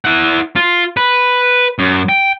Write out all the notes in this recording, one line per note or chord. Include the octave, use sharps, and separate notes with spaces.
E4 F#5
F4
B4
F#2
G5